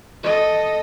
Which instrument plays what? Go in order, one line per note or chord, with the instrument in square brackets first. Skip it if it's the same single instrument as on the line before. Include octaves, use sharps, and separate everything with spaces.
[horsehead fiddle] A4 D#5